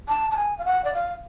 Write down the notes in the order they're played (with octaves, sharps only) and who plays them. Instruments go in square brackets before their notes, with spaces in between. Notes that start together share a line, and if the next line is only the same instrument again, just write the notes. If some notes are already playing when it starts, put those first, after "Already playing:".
[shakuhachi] A5
A5
G#5
F5
F#5
D5
F5